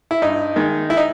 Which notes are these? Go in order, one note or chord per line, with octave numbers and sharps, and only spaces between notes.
E4
G2 D#4
D#3 G#3
E4
D#4